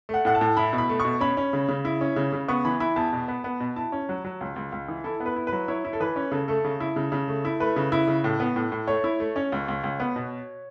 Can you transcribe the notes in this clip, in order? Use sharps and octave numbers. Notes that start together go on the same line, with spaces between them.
A3 F#5
A2 F#5
A5
A2
E4 B5
B2
B5
A3
B2 C#6
C#4 B5
C#4
C#3
C#3
E4
C#4
C#3
C#3
B3 C#6
E3 B5
E4 B5
E2 A5
B2
B3
B3
B2
E4 A5
C#4
F#3
F#3
C#2
C#2
C#2
E3
E4 A4
B3
B4
E4
B4
F#3
E4 C#5
E4
A4
E3 B4
C#4
C#3 A4
A3 A4
C#3
E4
C#3
C#3
A3
E4
A3 B4
C#3
E4
C#3
A2
B3
A2
A2
A3 C#5
E4
A3
C#4
C#2
C#2
C#2
B3
B2